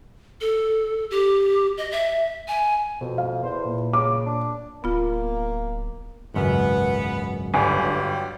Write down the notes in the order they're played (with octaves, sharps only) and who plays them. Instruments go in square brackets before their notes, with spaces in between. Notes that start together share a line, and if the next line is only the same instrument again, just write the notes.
[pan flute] A4
G4
D#5
E5
G#5
[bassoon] F2 [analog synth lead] B2
[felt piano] F5
[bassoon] E2 [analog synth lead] C5
[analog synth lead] A#2
[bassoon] C#3 [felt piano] D6
[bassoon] D4
[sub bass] D1 [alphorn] A#3 [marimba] B3 F4
[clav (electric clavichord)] G#1 C#2 F#2 [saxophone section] B3
[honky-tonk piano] G1 [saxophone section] G2 F#3 G3 [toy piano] G#5